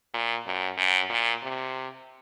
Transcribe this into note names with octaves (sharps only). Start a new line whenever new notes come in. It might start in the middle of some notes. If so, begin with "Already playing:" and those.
A#2
F#2
F#2
A#2
C3